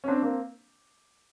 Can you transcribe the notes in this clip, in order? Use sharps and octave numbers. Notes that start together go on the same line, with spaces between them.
C#4
C4 D4
A#3 C4